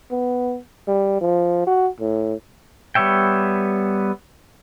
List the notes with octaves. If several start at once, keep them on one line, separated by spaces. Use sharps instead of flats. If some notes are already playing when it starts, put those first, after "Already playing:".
B3
G3
F3
F#4
A2
G3 B3 C#5 E5 G5